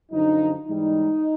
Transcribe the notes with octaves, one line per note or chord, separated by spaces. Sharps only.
F#2 D3 F3 D#4
G#2 E3 G3 D#4